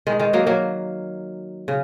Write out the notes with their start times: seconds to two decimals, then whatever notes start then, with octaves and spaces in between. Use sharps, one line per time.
0.07 D#3 G#3
0.20 D#3 G#3
0.33 F#3 A#3
0.47 F#3 A#3
1.68 C#3